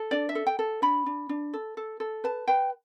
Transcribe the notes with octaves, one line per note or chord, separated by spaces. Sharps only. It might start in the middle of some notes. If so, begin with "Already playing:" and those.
Already playing: A4
D4 D5
E5
A4
G5
A4
D4 B5
D4
D4
A4
A4
A4
B4 A5
B4 G5